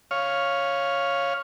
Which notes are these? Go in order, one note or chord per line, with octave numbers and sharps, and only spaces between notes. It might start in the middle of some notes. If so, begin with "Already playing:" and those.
C#5 F5